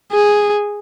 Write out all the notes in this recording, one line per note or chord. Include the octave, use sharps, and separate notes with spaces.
G#4